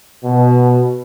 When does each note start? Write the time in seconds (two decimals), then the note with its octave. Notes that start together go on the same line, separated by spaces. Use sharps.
0.23 B2